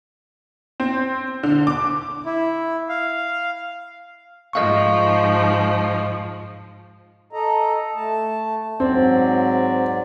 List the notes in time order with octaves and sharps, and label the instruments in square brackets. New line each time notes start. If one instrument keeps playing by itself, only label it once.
[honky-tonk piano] C4
D3
D6
[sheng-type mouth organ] E4
F5
[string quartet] G#2 F3 [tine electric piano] D#5 F5 C#6
[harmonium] A4 D#5 A#5
A3 A5
[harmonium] G#2 F#3 D5 [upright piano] C4